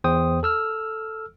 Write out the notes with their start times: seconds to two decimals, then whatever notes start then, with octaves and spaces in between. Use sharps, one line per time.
0.04 E2 C5 G5 D#6
0.43 A4 E6 F6